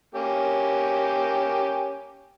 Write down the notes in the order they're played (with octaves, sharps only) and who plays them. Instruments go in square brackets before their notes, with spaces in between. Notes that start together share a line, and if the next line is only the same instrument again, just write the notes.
[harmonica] A#3 C#4 G4